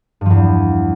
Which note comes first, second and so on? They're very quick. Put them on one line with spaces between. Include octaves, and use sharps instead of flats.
G2 F3 E2